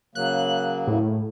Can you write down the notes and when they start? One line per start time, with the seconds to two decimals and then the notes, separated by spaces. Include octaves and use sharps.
0.15 C#3 F#3 A#3 F#6
0.87 A2